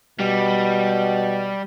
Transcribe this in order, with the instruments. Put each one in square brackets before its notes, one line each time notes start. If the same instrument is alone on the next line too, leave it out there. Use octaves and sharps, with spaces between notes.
[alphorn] B2 [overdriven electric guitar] G3